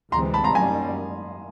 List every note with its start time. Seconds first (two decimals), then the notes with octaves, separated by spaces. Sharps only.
0.12 D2 C3 E3 G#3 C4 A#5 C6
0.34 A5 B5
0.44 A#5 C6
0.54 F#2 D#3 G3 A#3 C#4 G#5 A#5